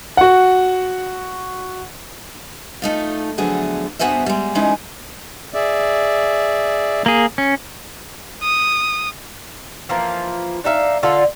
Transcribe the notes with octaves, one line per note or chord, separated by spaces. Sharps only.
F#4 F#5
A3 D#4 F4
D3 F3 F#3 A3 B3 G#4
G2 B3 F#4 G#4 C5 E5
G3 G#3
E3 F3 G#3 C#4 D#4 E4
G#4 D5 E5
A#3 G#4
C#4
D#6
E3 F3 A#3 F4
D4 D#4 E5 F5
D3 F4 A4